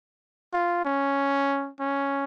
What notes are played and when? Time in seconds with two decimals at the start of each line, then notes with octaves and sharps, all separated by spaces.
0.53 F4
0.85 C#4
1.80 C#4